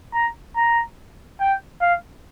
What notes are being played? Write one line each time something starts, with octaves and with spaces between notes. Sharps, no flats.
A#5
A#5
G5
F5